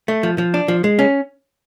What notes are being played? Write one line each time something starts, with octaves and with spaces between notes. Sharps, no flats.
A3
F3
F3
D4
F3
G#3
C#4